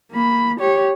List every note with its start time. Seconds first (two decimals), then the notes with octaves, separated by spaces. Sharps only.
0.11 A#3 B5
0.60 G4 C#5